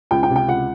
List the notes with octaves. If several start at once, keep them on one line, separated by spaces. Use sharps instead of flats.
C#2 G5
G5
C3
G5
C#2 F#5